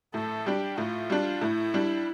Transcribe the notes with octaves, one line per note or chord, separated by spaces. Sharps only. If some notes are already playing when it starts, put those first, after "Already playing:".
A2 A4
G3 D4 G4
A2 F4
G3 D4
A2 E4
G3 D4